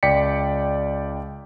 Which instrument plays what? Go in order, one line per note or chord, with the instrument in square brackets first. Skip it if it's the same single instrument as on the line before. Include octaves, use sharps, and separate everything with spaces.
[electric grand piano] C#2 D5 G5 B6 C#7